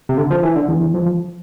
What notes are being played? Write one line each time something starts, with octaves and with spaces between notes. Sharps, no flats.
C3
D3
F3
E3
D3
E2
E2
F2
F2